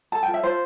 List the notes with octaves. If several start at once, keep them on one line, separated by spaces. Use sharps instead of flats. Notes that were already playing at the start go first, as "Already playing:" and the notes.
A4 A5
G5
F4
E5
F4 C5